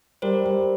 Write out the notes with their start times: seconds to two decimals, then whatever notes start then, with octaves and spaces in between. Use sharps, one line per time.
0.22 G3 A#4 C5
0.44 G3